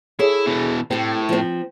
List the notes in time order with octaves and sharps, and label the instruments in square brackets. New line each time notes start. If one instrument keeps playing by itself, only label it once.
[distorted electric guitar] E4 [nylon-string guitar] G#4 A4 C#5
[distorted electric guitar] B2 E3
[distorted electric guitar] A2 [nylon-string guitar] C4 G4
[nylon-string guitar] F3 C4